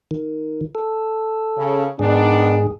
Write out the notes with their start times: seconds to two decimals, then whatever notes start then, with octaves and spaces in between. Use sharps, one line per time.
0.11 D#3
0.75 A4
1.57 C#3
1.99 G#2 D#3 B3 D4 G#4